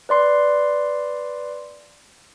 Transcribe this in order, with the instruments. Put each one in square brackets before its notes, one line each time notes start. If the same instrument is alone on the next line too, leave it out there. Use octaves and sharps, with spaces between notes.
[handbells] B4 D5 C6 C7